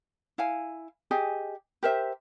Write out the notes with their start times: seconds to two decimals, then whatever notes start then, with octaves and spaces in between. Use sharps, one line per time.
0.38 E4 F5 G#5
1.11 G4 G#4 D#5 G#5
1.83 G4 A#4 C5 E5